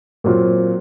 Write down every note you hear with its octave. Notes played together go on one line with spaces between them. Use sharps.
A#2 F#3 C4 F4